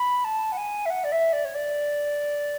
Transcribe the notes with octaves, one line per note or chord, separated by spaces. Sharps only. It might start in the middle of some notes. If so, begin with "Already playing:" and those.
Already playing: B5
A5
F#5
G#5
E5
F#5
D5
E5
D5
C#5
D5